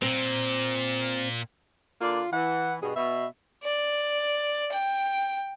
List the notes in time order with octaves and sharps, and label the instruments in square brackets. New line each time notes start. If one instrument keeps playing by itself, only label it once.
[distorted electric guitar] A#2 [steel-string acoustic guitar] C4
[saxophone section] D3 A#3 D5 [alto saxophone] F4
[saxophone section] E3 [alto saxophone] F#5
[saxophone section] G2 B2 [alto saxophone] G#4
[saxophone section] B2 [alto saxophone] E5
[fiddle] D5
G5